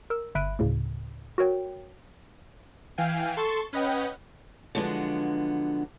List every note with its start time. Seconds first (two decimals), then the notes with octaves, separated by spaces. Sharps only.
0.10 A#4 E6
0.35 G1 E5 B5 F#6 D7 D#7
0.59 D2 A2 C#3
1.38 F#4 A#4 C#5 G5
2.98 E3 F5 G5 G#5
3.37 A4 C6 C#6 A6 E7
3.73 C#4 B4 D#5 F#5 G5
4.75 D3 F3 F#3 G#3 B3 D4